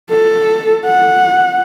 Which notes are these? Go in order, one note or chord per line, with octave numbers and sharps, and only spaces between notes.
A4
F#5